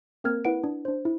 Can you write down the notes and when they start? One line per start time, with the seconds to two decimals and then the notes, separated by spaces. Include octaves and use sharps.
0.24 A#3 C4 A#4 F6 G#6
0.45 E4 B4 F#5 D7
0.64 D4
0.85 D4 C5
1.05 E4